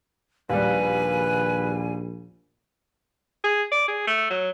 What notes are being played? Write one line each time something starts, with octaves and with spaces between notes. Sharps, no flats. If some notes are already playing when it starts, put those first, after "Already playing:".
A#1 D#2 G3 B4 G#5
G#4
D5
G#4
A3
F#3